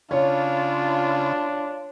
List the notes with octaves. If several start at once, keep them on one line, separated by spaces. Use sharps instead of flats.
C#3 D4 F4 C#5